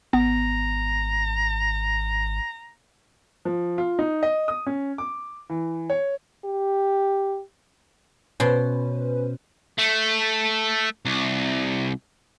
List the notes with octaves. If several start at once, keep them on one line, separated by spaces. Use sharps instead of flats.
G#1 B3 A#5
F3
F4
D#4
D#5
D#6
C#4
D6
E3
C#5
G4
B2 C#4 B4 C5 C6
A3
C2